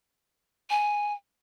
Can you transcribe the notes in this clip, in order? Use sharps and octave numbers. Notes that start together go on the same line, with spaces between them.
G#5